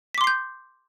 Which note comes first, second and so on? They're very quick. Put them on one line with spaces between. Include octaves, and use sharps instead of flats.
B6 D6 C6 C7 G6